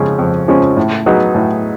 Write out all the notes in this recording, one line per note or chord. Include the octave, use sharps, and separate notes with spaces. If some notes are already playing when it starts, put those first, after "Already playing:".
Already playing: F2 C#3 F3 G#3 C#4
F2
C#3 F3 G#3 C#4
A2
F#3 B3 D#4 G#4
A2